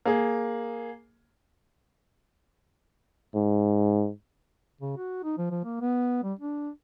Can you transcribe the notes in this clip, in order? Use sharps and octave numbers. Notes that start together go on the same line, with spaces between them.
A#3 G#4
G#2
C#3
F#4
D#4
F3
F3
A#3
B3
G3
D4